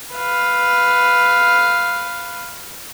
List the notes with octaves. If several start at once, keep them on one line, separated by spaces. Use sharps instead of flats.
B4 F5